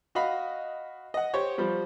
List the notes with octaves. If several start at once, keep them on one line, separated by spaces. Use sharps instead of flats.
F#4 D#5 F5 B5
D#5 F#5
G4 C5 C#5
F3 G3 C5